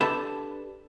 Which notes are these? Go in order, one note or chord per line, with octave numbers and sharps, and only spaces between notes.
D4 G4 A4 B4 A5 B5